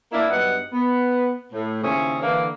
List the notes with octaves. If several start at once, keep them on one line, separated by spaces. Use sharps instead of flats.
A#3 D4 E4
G2 F#3 B3 D#4 F#5
B3
A2
D#2 C#3 C4 C#4 E4 G#4
D3 E3 A#3